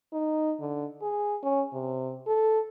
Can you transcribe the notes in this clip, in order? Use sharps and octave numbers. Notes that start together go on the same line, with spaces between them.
D#4
D3
G#4
C#4
C3
A4